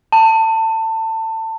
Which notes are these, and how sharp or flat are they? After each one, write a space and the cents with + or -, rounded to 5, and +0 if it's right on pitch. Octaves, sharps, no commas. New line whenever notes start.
A5 +25